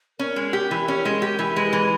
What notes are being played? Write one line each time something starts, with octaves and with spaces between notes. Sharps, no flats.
C#4 A#4
G#3
G4
E3
C#4
G#3
G4
E3
G#3 B4
E3